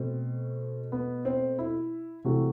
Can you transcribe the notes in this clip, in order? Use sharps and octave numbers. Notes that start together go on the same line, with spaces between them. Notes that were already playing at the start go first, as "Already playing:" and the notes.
Already playing: B2 A3 C4
B3
C4
E4
C3 E3 A3 F#4